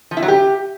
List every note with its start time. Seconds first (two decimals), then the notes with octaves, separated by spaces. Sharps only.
0.11 F3
0.17 E4
0.23 F#3
0.28 G4